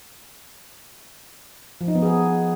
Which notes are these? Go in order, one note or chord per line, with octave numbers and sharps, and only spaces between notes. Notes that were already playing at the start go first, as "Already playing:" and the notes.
F3
D#4
B3
G#4